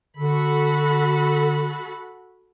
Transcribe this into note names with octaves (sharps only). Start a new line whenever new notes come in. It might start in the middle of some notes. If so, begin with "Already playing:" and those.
D3 F#4 A4 B5